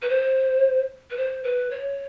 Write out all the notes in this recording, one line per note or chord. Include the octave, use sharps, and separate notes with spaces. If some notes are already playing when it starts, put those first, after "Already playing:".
B4
C5
B4
C5
B4
C#5